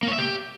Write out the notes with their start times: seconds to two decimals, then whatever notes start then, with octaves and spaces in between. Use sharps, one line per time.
0.03 A#3
0.08 C#5
0.13 E5
0.18 G4